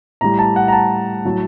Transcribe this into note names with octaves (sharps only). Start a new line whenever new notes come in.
A2 G3 A#5
A5
F#5
A#5
A5
A2 F#3